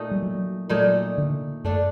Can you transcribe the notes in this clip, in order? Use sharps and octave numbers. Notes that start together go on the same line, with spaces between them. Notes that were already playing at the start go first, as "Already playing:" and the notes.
Already playing: A#2 A3 D#4
G3
F#3
A#2 F#3 A3 D#4
D3
F#2 A3 D4 A4